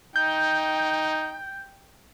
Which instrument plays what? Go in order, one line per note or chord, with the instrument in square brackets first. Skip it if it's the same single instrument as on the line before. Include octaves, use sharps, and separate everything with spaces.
[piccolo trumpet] D#4 [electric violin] G5 [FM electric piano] G6